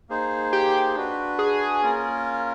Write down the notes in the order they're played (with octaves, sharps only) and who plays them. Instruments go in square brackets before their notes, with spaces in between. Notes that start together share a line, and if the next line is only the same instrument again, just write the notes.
[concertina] A#3 D#4 G#4 C5
[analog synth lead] G4
[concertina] D4 F#4 B4
[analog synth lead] G#4
[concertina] A#3 C#4 F4 A#4